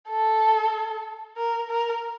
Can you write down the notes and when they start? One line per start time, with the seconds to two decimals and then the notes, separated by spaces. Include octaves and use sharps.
0.09 A4
1.37 A#4
1.69 A#4